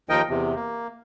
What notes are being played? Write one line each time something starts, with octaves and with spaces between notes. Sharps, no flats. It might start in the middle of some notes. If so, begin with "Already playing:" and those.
D#2 F3 D#4 A#4 D#5 G5
E2 C3
A#3